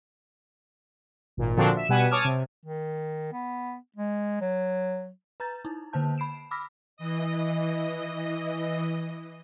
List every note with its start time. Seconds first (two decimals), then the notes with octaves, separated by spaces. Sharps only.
1.37 G#1 A#2
1.57 A#2 D3 F3 C4 D4 F#4
1.76 E5 E7
1.89 B2 G3 B4 F#5 G#5 E7
2.11 C#5 A5 D6 D#6 F6 G#6
2.25 C3
2.65 D#3
3.33 B3
3.96 G#3
4.41 F#3
5.40 B4 A#5 G6 A6
5.65 D#4 E4
5.93 D3 A#3 B4 C5 A5 G6
6.18 B5 C7 D7 E7
6.51 B5 D6 E6 F6 A#6 B6
6.97 E3 D#5